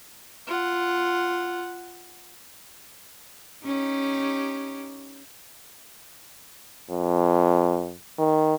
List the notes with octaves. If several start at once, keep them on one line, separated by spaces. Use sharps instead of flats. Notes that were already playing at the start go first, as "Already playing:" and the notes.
F4 F#5
C#4 D#4 G4
F2
D#3